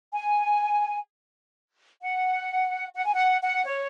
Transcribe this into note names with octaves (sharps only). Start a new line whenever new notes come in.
G#5
F#5
F#5
G#5
F#5
F#5
C#5